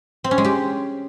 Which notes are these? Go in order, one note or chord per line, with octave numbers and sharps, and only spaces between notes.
C4
C#4
G#3
G4